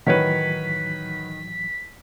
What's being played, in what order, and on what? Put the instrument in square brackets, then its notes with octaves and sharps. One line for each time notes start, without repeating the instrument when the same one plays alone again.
[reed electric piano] A2 E3 F#3 [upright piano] D#3 [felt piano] B4 C#5 F#5 [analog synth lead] B6